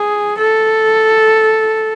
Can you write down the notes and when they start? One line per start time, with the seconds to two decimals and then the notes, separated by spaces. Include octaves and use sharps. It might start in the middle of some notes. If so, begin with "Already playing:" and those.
Already playing: G#4
0.38 A4